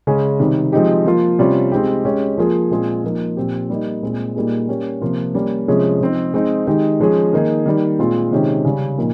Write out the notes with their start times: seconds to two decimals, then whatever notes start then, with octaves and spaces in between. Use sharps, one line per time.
0.07 C#3 G#3 C#4 G#4
0.39 C3 D#3 G3
0.72 F3 G#3 C4 D#4 G4
1.06 F3 A#3 F4
1.39 C3 G3 C#4 F4
1.72 G#3 C4 D#4 G4
2.05 G#3 C#4 G4
2.38 F3 A#3 F4 G#4
2.71 A#2 G#3 C4 F4 G#4
3.04 F3 A#3 D#4
3.37 A#2 F3 C4 G4
3.70 G3 A#3 D#4
4.03 A#2 G#3 C4
4.36 A#2 G3 A#3 D#4 G#4
4.69 G3 A#3 C#4 G4
5.01 C3 F3 A#3 F4
5.34 G3 A#3 C#4
5.68 C3 F3 G#3 C#4 G#4
6.01 F3 C4 D#4
6.34 G#3 C4 D#4
6.67 D#3 G#3 D#4 G4
7.00 F3 G#3 C#4 G#4
7.33 D#3 A#3 D#4 G#4
7.66 D#3 G3 A#3
7.99 A#2 G#3 C4 F4
8.31 C3 D#3 G#3 C#4 G4
8.64 C#3 G3 C#4
8.98 A#2 F3 A#3 D#4